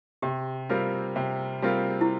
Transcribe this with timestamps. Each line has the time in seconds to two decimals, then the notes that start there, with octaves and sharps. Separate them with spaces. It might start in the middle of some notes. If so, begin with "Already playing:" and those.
0.22 C3 G4
0.69 G3 C4 F4 A#4
1.16 C3
1.62 G3 C4 F4 A#4
2.01 E4